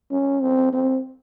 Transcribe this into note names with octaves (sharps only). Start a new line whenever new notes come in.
C#4
C4
C4